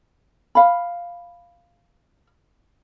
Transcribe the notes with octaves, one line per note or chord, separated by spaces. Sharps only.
F5 B5